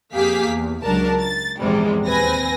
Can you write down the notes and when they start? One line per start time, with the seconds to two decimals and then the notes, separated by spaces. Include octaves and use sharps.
0.13 F2 A#3 G4 G#4 F5 B6
0.45 E2
0.83 C#2 F#3 D4 A#4 A5
1.20 A6
1.60 A#1 E2 G#2 C3 G3 G#3
2.05 D#2 C4 B4 G#5 A#6